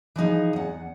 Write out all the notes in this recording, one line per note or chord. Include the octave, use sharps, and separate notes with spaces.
E3 F3 D#4 G#4
E2 F#5